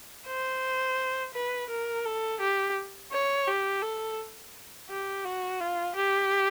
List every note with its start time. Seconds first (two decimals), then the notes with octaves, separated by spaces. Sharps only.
0.27 C5
1.34 B4
1.70 A#4
2.05 A4
2.40 G4
3.12 C#5
3.47 G4
3.82 A4
4.90 G4
5.25 F#4
5.60 F4
5.96 G4